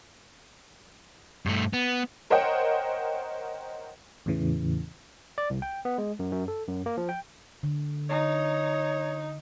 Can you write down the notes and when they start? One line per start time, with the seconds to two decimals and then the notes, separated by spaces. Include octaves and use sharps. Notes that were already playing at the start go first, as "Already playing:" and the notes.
1.46 G2 A3
1.73 B3
2.30 A#4 C5 C#5 D#5 F#5 G5
4.26 E2 A2 C#3 E3
5.38 D5
5.50 C2
5.62 G5
5.85 B3
5.98 G#3
6.19 F#2
6.32 F#2
6.48 A4
6.68 F#2
6.86 A#3
6.97 F3
7.09 G5
7.63 D3
8.09 D#4 C#5